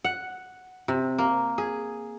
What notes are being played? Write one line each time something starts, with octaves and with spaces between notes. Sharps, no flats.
F#5
C3
A#3
G#4